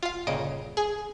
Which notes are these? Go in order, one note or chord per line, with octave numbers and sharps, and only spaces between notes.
F4 F5
G1 A#2 C#3 D#5 D7
G#4